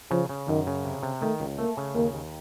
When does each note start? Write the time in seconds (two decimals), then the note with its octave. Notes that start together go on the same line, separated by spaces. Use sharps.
0.11 C#3 F3
0.29 C#3
0.48 F#2 D#3
0.67 C#3
0.85 C3
1.03 C3
1.22 D#3 A3
1.40 C#2
1.58 A3 A#3
1.77 C#3
1.95 D#2 A#3
2.14 D#2